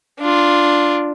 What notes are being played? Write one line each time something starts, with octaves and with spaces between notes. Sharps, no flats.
D4 F4